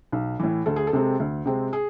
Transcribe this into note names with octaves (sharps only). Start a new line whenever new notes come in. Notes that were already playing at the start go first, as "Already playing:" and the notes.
B1
A2 E3
D2 A4
G#4
A4
C3 G#3 C4
D2
C3 G#3 C4
G#4